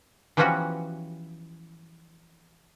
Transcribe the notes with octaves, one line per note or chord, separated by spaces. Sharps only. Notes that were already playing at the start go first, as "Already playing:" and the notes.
E3 F3 G3 B3 C#4 F#4